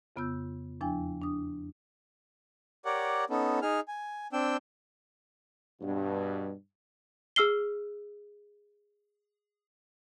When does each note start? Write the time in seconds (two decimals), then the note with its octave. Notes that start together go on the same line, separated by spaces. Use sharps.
0.16 F2 C#3 B3 F4 E6 G6
0.81 E2 F3 D4 E4 G5 G#5
1.22 D4 D#6
2.85 G4 A#4 C#5 D5 F#5
3.30 B3 C#4 D#4 A4
3.62 D#4 G#4 F6
3.88 G#5
4.33 C4 D4 G5 E6
5.81 G2 B2
7.36 G#4 E6 F6 C7 G7